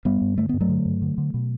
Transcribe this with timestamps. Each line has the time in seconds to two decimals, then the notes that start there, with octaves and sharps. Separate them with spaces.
0.05 G2 G3 B3
0.21 G2
0.37 D3 A3
0.49 G2 B3
0.61 F#3 A3
0.69 D3
0.85 G2
1.02 D3
1.18 D3
1.34 B2